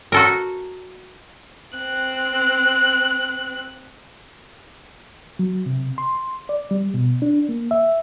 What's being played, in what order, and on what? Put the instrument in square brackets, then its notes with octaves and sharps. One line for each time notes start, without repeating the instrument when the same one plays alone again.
[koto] F#4 A4 A#4
[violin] C4 F#6
[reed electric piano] F#3
C3
C6
D5
G3
B2
D4
A#3
E5